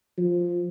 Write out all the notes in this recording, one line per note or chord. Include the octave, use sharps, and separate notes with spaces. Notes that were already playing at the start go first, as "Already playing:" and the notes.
F3